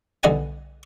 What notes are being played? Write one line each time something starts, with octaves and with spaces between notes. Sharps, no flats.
B1 D3 G3 D#5 F#5 G#5